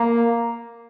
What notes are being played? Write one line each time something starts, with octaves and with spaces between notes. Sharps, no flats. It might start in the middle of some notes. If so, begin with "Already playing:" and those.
Already playing: A#3